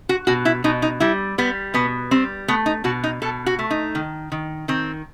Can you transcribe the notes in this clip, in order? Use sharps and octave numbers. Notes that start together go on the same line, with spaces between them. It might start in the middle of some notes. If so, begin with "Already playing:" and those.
F#4
B2 F#4
E4
B2 D#4
D#4
G3 E4
G3 B3
B2 B3
G3 C4
A3 B3
D#4
B2 F#4
D#4
B2 A4
F#4
A3
D#4
D#3
D#3
D#3 C4